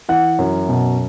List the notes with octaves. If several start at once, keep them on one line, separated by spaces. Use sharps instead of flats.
E3 F#5
F#2
B2